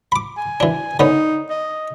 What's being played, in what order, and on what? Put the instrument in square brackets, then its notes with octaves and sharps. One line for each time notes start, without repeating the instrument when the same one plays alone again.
[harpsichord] B5 D6
[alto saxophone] G#5
[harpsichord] E3 D4
[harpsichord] D3 B3 C#4 [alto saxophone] D#4
[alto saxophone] D#5